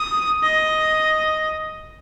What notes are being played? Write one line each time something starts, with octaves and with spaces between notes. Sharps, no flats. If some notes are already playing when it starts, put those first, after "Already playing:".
Already playing: D#6
D#5